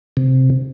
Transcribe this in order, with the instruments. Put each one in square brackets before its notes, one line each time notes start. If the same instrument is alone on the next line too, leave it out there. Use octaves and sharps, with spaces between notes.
[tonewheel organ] C3